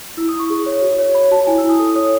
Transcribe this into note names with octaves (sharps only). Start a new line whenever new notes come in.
E4 E6
D#6
E4
C#6
G#4
C#5
F#4
C#5
C#5 B5
F#4 A5
E4 G#5
E6
E4
D#6
A4 D#6
C#5 D#6